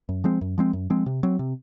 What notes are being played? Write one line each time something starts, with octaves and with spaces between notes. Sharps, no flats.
F#2
F3 G#3 C4
F#2
F3 G#3 C4
F#2
F3 G#3 C4
C3
F#3 C4
C3